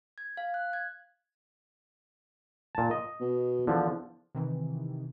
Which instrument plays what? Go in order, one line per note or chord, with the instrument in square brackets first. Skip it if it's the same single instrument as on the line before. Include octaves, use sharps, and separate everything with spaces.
[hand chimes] G#6
F5
F#6
G#6
[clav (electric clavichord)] A#2 A5
D#5
[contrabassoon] B2
[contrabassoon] E2 [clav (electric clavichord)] D3 F3
[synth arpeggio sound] C3 D#3 E3